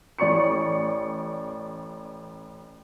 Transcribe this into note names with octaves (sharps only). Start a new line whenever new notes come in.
A1 D5 C#6 C#7